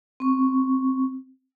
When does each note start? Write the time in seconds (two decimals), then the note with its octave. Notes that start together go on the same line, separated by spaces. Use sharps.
0.20 C4 C#6